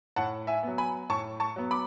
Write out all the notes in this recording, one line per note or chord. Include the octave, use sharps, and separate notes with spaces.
A2 F#5 A5
E5 G#5
F#3 B3
G#5 B5
A2 A5 C#6
A5 C#6
F#3 B3
B5 D6